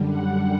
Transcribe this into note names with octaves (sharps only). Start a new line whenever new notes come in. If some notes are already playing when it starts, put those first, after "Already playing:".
Already playing: F#2 D3 G3
F#5